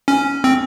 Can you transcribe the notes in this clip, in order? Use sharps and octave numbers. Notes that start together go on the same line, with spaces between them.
C#4
C4